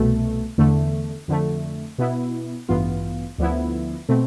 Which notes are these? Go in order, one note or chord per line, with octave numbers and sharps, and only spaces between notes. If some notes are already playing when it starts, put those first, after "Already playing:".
Already playing: C2 B2 A3
E2 D3 A3
F2 D3 A3
B2 B3 E4
A1 G2 E3 B3 F4
D2 D3 F3 B3 E4
B2 A3 C4